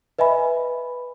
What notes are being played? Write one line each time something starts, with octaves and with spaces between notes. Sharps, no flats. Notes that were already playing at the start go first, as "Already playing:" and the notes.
B4 D#5 E5 G#5 B5